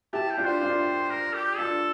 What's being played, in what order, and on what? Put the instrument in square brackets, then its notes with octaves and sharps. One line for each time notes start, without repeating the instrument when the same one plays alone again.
[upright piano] E4 G4 [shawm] A5
[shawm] G5
[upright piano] D4 F4
[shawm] C5
[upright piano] D4 F4
[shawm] A#4
G4
[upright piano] D4 F4 [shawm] A4